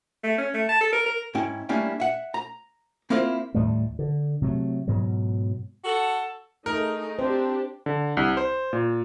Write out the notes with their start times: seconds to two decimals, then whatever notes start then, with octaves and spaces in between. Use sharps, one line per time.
0.24 A3
0.38 C#4
0.54 A3
0.69 A5
0.81 A4
0.93 A#4
1.06 A#4
1.35 G#2 C#4 E4 G5
1.69 G3 A3 A#3 C#4 D4 E4
2.00 E5 F#5
2.34 A#5
3.10 A#3 C4 E4 F4 A#4 C5
3.54 D#2 A2 G3 A3
3.99 D3
4.42 C3 F#3 A3
4.88 G#2 B2 F#3
5.84 F#4 A4
6.66 A3 D#4 G#4 A#4
7.19 C4 D4 G4 C5
7.86 D3
8.17 C2
8.37 C5
8.73 A#2